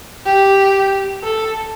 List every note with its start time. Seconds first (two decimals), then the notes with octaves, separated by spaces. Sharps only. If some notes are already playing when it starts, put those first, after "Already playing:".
0.26 G4
1.23 A4